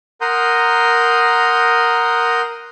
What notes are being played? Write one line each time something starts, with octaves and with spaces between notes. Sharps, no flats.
A#4 F#5 A#5 C6 D#6 G6